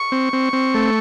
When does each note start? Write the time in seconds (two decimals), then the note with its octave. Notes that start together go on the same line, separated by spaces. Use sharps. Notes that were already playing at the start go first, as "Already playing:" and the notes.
Already playing: C#6
0.12 C4
0.33 C4
0.53 C4
0.74 A3